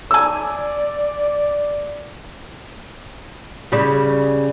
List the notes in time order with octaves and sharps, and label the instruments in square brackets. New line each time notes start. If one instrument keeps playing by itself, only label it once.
[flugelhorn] D5 [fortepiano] G#5 E6
[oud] C#3 G3